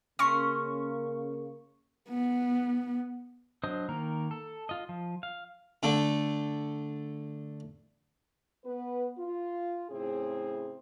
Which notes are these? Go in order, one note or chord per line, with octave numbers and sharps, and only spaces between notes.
C#3 A#3 C#4 A#5 C6 C#6
B3
F#3 D4 C5 D#5 D#6
D#3 A#3 A#4
A4
F4 D#5
F3
F5
D3 A3
B3 B4
F4
A2 C#3 C4 G#4